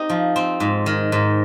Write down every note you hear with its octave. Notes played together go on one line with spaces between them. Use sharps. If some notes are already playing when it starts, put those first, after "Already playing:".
Already playing: C4 D#4 G4
F3
C4
G#2
D#3
G#2